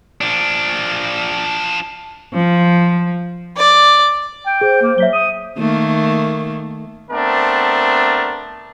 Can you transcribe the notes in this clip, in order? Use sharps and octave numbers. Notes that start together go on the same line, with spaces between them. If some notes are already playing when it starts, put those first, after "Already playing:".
F3 D4
F3
D5
G5
G#4 C5
A#3
F#3 E5 B6 G7
D#6
D#3 A3 A#3
A3 B3 C4 D4 A#4